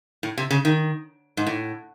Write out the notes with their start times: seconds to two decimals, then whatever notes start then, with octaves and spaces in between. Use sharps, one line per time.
0.23 A2
0.38 C3
0.51 C#3
0.65 D#3
1.37 G#2
1.47 A2